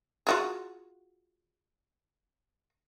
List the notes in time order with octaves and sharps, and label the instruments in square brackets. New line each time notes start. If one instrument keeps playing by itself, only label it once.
[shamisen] F4 F#4 G#4